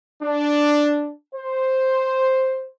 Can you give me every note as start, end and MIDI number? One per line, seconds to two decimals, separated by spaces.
0.22 1.11 62
1.34 2.68 72